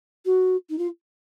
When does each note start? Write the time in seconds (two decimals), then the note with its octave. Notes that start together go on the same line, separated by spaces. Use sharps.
0.25 F#4
0.69 D#4
0.78 F4